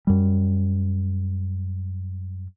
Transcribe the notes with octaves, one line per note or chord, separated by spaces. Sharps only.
F#2 G3